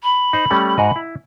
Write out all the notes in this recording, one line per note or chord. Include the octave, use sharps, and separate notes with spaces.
B5
D#4 C5
G3 A3 C#4
G#2 F#4 D#5
E4